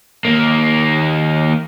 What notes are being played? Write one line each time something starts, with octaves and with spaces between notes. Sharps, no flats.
D#2 A#3